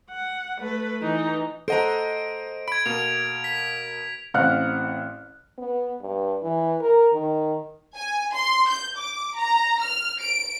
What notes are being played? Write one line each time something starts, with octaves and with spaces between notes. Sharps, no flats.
F#5
A3 B4
E3 D#4
A4 C5 D#5 F#5 A#5 D7
B5 G#6 D7
B2 A#3 F7
B6
A1 C4 F5 F#5 F6 F#6
B3
G2
E3
A#4
D#3
G#5
C6
G6
D6
A#5
F6
D7